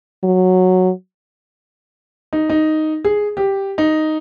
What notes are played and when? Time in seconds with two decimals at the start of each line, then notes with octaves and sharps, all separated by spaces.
0.24 F#3
2.33 D#4
2.50 D#4
3.04 G#4
3.37 G4
3.78 D#4